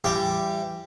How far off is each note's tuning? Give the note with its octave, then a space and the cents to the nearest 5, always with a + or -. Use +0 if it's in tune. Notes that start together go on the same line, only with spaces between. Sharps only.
E3 +30 G3 +0 G4 +0